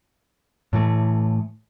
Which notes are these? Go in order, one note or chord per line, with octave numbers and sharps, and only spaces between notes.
A2 E3 A3